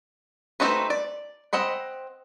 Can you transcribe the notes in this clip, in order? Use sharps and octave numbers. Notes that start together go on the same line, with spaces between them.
A3 C4 D#4 F#4 B4
D5
C4 D#5 F#5 B5